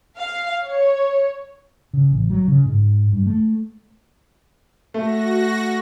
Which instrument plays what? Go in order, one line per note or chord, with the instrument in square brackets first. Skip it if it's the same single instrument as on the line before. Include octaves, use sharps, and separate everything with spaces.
[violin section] F5
C#5
[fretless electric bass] C#3
A1
F#3
C#3
G#2
G2
A3
[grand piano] A3 [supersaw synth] F#4 A#6